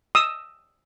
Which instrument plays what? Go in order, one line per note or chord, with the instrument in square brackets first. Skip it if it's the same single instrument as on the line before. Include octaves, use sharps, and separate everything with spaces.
[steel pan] D#6 E6